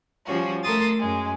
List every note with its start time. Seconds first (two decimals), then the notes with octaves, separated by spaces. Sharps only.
0.24 F3 G3 C#4 F#4
0.62 A3 A4 A#4 C6 D#6 A6
0.97 F#2 G#3